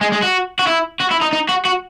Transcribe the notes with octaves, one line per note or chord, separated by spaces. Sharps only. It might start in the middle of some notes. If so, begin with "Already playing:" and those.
G#3
G#3
F#4
F#4
E4
F#4
E4
D#4
D#4
F#4
F#4